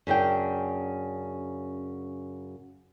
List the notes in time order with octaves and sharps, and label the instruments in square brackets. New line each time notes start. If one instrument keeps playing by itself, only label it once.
[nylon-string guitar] F#2 C#3 D4 G5